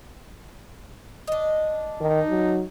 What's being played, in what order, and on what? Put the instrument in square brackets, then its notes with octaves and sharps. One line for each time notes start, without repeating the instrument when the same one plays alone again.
[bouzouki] D4 D#5
[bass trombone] D#3 [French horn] D#4
[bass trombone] F#3